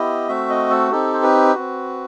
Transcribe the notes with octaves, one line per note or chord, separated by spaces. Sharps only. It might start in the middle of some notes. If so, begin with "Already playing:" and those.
Already playing: B3 E4 G4 D#5
A3 C4 F#4 E5
D#5
A4
C4 D#4 G4 A4
C5
B4
C4 F#4